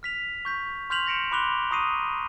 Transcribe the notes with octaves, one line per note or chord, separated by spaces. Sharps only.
F6 B6 F7
C#6 G6 B6
C6 F6 G6 B6 F7 F#7
G6 A#6 C#7 D7 E7
B5 C6 D6 F#6 F7 G7
A#5 C#6 D#6 A#6 C7 D#7